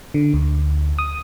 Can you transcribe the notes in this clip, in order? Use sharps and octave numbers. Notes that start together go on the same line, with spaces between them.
D3
D2
D#6